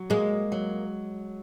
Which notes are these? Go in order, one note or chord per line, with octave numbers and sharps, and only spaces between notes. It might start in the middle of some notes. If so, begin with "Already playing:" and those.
Already playing: F#3
G#3 A#3
F#3